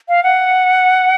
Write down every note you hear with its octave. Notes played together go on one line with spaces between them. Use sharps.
F5
F#5